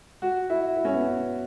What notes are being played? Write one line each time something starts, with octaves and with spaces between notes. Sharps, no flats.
F#4
E4
E4
C#4
B3
C#4